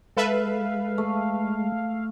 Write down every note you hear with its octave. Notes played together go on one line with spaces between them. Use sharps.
G#3 A4 B4 E5 F5
A3